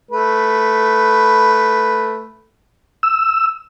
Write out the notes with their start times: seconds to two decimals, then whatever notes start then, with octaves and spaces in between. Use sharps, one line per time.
0.11 A3 B4
3.03 E6